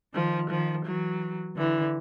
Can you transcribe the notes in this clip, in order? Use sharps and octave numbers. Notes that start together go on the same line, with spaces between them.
D#3 F3
D#3 F3
E3 F#3
D3 E3